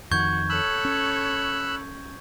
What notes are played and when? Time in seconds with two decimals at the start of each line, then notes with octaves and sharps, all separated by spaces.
0.11 F2 D#3 F#4 C#6 G6 G#6
0.50 A4 C#5 B5 E6 F#6
0.85 C#4